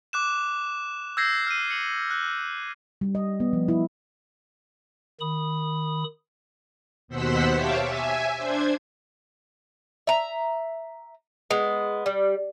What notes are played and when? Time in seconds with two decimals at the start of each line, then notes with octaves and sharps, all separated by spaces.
0.13 D6 F#6 E7
1.17 E6 G6 G#6 A#6 C7
1.47 F6 C7 D#7
1.70 C#7 F#7
2.10 F#6
3.01 G3
3.15 D#5
3.40 B3
3.53 F3
3.68 E4
5.21 D#3 B5 D#6
7.08 D#2 B2 C5 F#5 E6 B6
7.53 G4 C#5 E5 F5 A5 D6
7.83 E5 G#5
8.37 D4 C5 G#6
10.07 E5 A#5
11.50 G#3 B3
12.06 G3